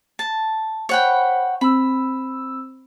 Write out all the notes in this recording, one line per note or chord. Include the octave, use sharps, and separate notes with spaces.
A5
C5 C#5 F#5 G5 B5
C4 B5 E6